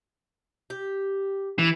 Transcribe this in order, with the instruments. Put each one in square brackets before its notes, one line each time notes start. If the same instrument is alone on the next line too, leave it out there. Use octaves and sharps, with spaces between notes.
[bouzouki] G4
[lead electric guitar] E3